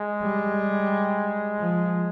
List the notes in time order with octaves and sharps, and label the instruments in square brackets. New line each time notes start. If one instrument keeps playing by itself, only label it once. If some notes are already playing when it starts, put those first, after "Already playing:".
Already playing: [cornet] G#3
[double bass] G3
F3